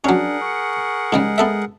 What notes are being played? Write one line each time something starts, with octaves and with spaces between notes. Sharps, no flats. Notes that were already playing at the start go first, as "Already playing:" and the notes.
F#3 C#4 D4 G#4 A#4 F#5
C#6
G#2 C#3 G3 G#3
B3 A4 E5